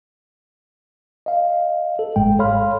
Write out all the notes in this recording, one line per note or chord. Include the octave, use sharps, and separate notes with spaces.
D#5 F5
A4
G1 G#2 G#3 G5
A4 C#5 F5 B5 C6 F6